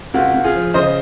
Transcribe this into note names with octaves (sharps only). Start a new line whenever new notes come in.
C#2 F#4
C#2
F4 G#4
F3
C#3 C5 D#5